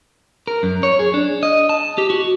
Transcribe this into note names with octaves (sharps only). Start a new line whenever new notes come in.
A#4
F#2
C#5
G#4
D4
D#5
A5
G4
F#4